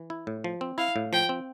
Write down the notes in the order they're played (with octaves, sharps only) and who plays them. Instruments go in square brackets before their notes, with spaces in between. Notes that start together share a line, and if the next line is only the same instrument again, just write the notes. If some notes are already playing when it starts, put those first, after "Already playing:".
Already playing: [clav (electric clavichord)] E3
E4
A2
F3
C4
[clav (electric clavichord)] E4 [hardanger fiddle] F5
[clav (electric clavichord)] A2
[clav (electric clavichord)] F3 [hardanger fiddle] G5
[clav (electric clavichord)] C4